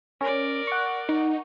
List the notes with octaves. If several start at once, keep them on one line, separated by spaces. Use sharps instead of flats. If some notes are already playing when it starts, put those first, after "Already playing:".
C#4 A#4 D5
F#5 C#6
D#4